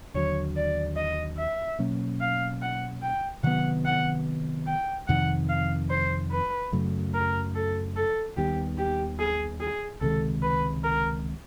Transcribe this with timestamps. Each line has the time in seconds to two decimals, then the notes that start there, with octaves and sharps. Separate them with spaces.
0.14 D#2 D3 F#3 C#5
0.56 D5
0.97 D#5
1.38 E5
1.79 B2 F#3 A#3 C#4
2.21 F5
2.62 F#5
3.03 G5
3.43 C3 D#3 F#3 B3 F#5
3.85 F#5
4.66 G5
5.08 F2 C3 D#3 F#5
5.49 F5
5.90 C5
6.31 B4
6.72 F#2 C#3 F#3 A3
7.14 A#4
7.55 A4
7.96 A4
8.37 D#2 D#3 G3 B3 G4
8.78 G4
9.20 G#4
9.61 G#4
10.01 C#2 C3 D#3 G#3 A4
10.43 B4
10.84 A#4